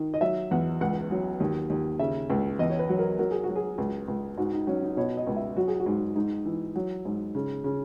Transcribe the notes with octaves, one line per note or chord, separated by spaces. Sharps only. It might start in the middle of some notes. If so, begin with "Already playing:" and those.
Already playing: D#3
D#5
F#3 E5
E2 F#5
C#2 F#5
F#3
D#2
D#2
C#3 E5
C#2
E2 D#5
C#5
B4
F#3
A#4
F#3 A#4
G#4
F#4
F#3
G#4
C#2
C#2
G#2 F#4
D#4
F#3 C#4
D#4
B2 C#5
D#5
C#2
E5
F#3 F#4
G#4
F#4
G#2
G#2 D#4
E3
F#3
G#2
C#3
C#3